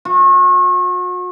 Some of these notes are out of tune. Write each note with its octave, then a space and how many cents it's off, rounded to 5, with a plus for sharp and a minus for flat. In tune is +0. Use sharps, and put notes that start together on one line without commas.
F#4 -40